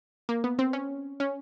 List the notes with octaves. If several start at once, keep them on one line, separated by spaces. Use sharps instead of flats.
A#3
B3
C4
C#4
C#4